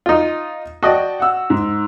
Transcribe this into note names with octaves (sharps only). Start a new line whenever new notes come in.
D#4 F4
F#4 D5 D#5 G5 A5
F#5 E6
G#2